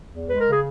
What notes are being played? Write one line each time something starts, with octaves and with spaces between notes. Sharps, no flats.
E2
G#3 B4
A#4
C#3
G#4